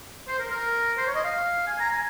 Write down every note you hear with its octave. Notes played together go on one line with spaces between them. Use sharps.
C5
A#4
A#4
C5
C#5
D#5
F5
G#5
A#5
G#5